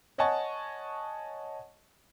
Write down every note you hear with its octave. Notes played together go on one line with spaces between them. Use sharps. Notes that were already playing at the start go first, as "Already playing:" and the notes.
C#5 D#5 F#5 G#5 A5 C#6